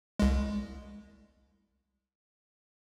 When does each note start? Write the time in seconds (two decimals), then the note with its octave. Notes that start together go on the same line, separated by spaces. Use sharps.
0.19 C2 G#3